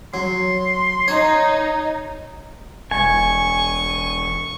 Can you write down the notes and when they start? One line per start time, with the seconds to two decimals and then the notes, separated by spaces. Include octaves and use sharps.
0.14 F#3 C6
1.08 D#4 C#5
2.91 E1 G#5 C#6